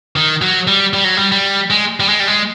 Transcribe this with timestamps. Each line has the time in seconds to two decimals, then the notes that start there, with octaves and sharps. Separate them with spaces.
0.16 D#3
0.42 F#3
0.67 G3
0.94 G3
1.04 F#3
1.17 G3
1.32 G3
1.70 G#3
2.00 G3
2.09 G#3
2.20 G3
2.27 G#3